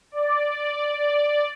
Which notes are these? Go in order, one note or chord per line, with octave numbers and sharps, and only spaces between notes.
D5
D5